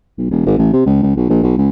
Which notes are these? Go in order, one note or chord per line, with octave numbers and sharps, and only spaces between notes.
B1
E1
G#1
A1
C3
C#2
C#2
B1
A#1
B1
C#2